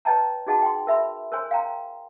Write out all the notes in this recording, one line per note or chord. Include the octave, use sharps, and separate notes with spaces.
B4 C#5 D#5 G5 A5 A#5
D#4 F#4 G#4 D#5 F#5 A5
G5 C6
A#4 E5 B5 C6
A#4 C5 C#5 G#5 C6
F5 G5 A#5 C6